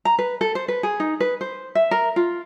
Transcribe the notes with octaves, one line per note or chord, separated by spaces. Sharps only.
A#5
B4
A4
C5
B4
G#4
D#4
B4
C5
E5
A#4
F4